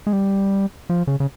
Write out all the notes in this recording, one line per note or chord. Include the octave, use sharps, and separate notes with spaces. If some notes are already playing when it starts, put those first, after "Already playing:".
G#3
G3
F3
C#3
C#3